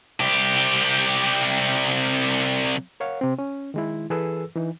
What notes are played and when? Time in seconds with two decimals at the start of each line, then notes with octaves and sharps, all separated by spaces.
0.20 C2 G4
3.00 A#4 C#5 F5 F#5
3.21 C3 C4
3.39 C#4
3.74 D#3 G#3 E4
4.10 E3 G#4 A4 B4 E6
4.55 E3 D#4